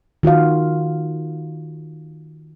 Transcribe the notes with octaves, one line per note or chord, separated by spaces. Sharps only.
D#3 F4 F#4 F5